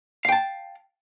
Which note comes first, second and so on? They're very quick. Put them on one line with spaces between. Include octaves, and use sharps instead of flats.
F5 G5 A5